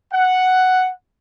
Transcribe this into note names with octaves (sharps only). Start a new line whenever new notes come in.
F#5